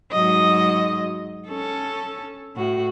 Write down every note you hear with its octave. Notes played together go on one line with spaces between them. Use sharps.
G#2 F#3 D#5
C#4 A4
A2 F#4